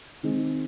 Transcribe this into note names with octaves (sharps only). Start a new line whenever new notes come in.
D#3 G#3 C4